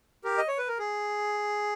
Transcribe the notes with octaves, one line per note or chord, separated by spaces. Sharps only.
G4 A#4
D#5
C#5
B4
A#4
G#4